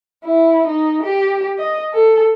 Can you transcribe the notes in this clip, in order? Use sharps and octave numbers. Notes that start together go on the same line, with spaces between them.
E4
D#4
G4
D#5
A4